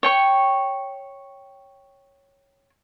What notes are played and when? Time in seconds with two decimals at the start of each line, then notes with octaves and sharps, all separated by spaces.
0.03 C#5 G5 C#6